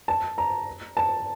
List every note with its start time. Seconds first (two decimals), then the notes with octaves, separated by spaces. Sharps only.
0.08 A5
0.38 A#5
0.97 A5